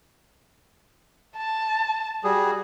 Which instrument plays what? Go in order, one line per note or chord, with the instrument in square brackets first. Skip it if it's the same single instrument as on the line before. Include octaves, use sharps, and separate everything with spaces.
[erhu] A5
[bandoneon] G3 G#4 [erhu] F#4